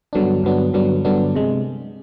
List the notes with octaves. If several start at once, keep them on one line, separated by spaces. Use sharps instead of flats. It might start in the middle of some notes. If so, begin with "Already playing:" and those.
G2 D3 F#3 B3 D4
G2 D3 F#3 B3 D4
G2 D3 F#3 B3 D4
G2 D3 F#3 B3 D4
C3 G#3